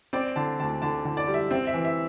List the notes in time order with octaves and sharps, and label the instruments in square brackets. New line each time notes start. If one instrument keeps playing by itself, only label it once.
[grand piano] C4 D5
D3 A5
D2 A5
D3 A5
D3
D5
G3
E5
C4 E5
E5
E3
E5